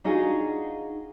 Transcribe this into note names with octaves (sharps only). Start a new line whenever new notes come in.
D4 D#4 F4 F#4 G#4